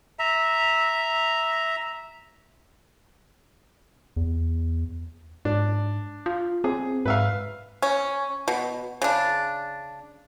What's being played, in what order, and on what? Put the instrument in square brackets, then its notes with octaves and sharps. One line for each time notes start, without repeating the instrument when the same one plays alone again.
[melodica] E5 A#5
[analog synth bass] E2
[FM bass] G#2 [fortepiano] D4
[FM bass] F4
[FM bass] C4 [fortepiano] G#4
[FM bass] G#2 [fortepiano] B4 E5 F5
[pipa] C#4
B2
C#3 D4